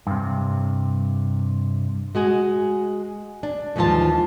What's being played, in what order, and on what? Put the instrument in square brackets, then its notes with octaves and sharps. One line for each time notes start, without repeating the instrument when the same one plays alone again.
[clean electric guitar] G2 C3
[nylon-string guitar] G#3 F#4 G#4
D4
D#2 G#2 E3 F3 F4 A5